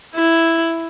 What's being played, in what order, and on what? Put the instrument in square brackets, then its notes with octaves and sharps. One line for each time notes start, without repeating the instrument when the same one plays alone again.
[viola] E4